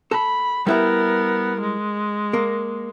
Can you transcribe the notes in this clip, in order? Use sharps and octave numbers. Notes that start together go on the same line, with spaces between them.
A4 B5
G3 B3 E4 A#4 E5
G#3
A#3 A#4